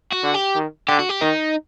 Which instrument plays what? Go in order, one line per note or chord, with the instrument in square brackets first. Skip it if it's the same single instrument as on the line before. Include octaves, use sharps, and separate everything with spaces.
[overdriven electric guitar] F#4
[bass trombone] D3
[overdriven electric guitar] G4
[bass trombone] D#3
[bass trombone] D3 [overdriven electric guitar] G4
[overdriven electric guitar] F#4
G4
[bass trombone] D#3 [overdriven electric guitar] D#4